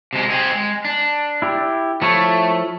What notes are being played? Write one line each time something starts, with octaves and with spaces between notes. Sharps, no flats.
C3 G#3
C4 G#4
G#3
D4
E4 G4
F3 A3 E4 C#5